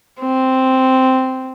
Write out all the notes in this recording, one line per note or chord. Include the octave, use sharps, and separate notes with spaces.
C4